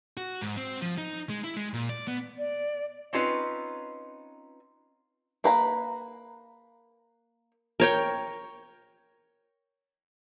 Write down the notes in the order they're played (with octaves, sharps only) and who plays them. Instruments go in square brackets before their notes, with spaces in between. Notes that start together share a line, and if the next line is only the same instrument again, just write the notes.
[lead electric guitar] F#4
G#2
C4
F3
D#4
G#3
E4
G#3
A#2
D5
B3
[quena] D5
[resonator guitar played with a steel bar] C4 C#4 D#4 F4 B4
[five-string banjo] A#3 B4 A#5
[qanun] A#4 C#5 G5